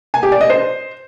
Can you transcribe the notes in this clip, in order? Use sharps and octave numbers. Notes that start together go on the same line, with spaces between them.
G#5
G4
D5
D#5
C5